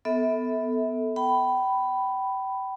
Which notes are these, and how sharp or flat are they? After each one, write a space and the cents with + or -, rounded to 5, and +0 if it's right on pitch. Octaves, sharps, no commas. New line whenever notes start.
B3 +10 A4 +0 E5 -30
G5 -30 B5 +5